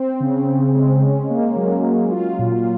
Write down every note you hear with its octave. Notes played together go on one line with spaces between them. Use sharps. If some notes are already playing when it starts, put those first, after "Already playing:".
Already playing: C4
C#3
C#3
G#3
C#4
A#3
F#3
F#3
F4
A#2